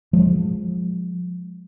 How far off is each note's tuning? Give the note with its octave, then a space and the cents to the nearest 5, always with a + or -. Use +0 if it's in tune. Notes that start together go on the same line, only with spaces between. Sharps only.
F3 +30 G#3 +0